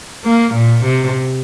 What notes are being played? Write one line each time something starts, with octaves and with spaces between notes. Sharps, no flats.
A#3
A#2
C3